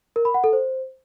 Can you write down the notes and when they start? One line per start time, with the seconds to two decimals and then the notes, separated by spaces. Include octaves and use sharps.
0.16 A#4
0.25 B5
0.34 F#5
0.44 A4
0.53 C5